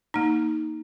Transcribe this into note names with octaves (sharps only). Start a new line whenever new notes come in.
A#3 D#4